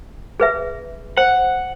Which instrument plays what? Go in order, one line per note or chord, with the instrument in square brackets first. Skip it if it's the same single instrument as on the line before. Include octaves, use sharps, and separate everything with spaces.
[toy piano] G#4 B4 E5
[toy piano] C5 [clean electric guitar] F#5